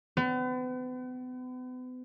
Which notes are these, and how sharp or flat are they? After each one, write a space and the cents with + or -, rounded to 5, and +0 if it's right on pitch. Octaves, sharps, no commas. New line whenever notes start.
B3 +40